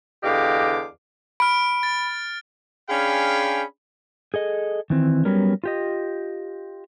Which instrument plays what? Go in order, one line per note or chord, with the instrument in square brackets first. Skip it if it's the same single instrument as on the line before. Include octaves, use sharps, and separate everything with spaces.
[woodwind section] E2 D3 G4 D#5 F5 D6
[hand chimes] B5 [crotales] F6 D7
[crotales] A6
[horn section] C#4 D4 G#4 F5 G5 B5
[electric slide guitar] G#4 A4 D#5
D#3 E3 C4
F#3 G3 B3 C#4 A#4
F4 G4 D#5